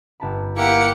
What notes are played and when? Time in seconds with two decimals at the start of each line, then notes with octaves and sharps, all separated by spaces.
0.20 G1 A5 B5
0.57 A#3 E4 G4 F#5 C#7